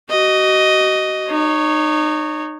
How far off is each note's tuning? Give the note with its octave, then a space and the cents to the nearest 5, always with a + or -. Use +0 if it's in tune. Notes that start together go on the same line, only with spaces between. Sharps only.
F#4 +35 D#5 +0
D#4 -30 C#5 +0